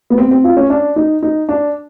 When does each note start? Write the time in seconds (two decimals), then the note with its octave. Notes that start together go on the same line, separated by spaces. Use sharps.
0.10 B3
0.18 C4
0.31 C4
0.44 F4
0.57 C#4
0.70 D4
0.96 D#4
1.23 D#4
1.49 D4